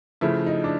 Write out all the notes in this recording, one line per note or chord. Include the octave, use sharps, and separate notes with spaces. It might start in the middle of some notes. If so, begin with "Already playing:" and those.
C#3 F3 A3 E4
D#4
D4